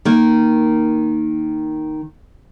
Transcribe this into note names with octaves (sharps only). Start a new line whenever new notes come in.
D#3 A#3